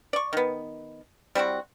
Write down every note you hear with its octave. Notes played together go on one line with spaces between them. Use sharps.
D5 C#6
D#3 B3
G3 C4 E4 F#4